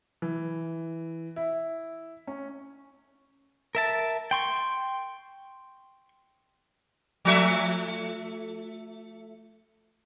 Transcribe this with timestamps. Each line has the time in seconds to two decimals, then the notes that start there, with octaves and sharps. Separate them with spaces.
0.22 E3
1.36 E4
2.27 C#4
3.75 A#4 E5 A5
4.31 G5 C6 C#6
7.25 F3 A3 E5